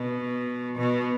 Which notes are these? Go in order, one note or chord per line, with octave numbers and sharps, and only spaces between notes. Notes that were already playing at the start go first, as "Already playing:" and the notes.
Already playing: B2
B2